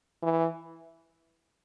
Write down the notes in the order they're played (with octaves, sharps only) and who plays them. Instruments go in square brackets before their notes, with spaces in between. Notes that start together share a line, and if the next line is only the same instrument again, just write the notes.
[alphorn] E3